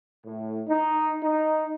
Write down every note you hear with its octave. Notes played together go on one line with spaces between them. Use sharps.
A2
D#4
D#4